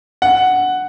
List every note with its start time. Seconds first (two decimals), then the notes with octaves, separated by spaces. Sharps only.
0.22 F#5